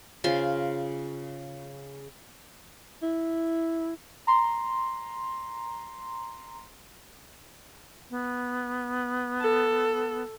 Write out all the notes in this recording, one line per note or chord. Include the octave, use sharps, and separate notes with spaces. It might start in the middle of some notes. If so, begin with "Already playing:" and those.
C#3 F4 C5 G#5
E4
A#5 C6
B3
A4